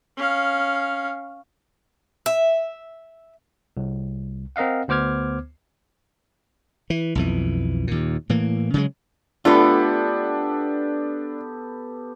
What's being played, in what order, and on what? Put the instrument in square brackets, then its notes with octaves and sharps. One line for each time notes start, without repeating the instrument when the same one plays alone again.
[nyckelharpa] C#4 F5
[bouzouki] E5
[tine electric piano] C2
C4 A#4 D#5 F5 F#5
D2 B3 C5 D6 F6 G#6
[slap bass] E3
B1 F2 E3
D#2 A#2
A2 E3 A#3
C#3 F#3 G#3
[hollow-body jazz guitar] A3 F4 [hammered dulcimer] B3 G4 A4 [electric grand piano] D4